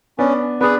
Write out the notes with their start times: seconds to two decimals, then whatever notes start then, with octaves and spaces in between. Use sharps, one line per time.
0.18 B3 C#4 D4
0.60 B3 D4 G#4 B4